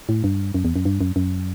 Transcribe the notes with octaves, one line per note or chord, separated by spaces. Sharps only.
A2
G2
F#2
E2
F#2
G2
F#2
F#2